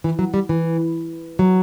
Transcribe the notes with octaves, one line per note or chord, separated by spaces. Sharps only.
E3
F#3
G3
E3
F#3